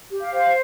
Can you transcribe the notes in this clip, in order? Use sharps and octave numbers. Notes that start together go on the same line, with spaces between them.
G4
F5
C5